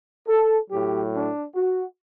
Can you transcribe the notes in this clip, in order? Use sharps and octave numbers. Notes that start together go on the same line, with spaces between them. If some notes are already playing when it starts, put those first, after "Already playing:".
A4
A2 F#3 G4
D4
F#4